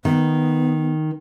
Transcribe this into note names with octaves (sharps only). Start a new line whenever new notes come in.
D#3 B3